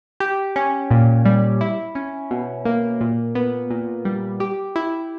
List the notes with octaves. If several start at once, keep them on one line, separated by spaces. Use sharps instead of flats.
G4
C#4
A#2
G3
E4
C#4
B2
A#3
A#2
B3
A#2
G3
G4
E4